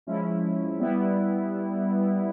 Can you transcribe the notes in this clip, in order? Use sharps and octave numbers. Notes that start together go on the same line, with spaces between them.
F3 G#3 C#4 E4
G3 B3 E4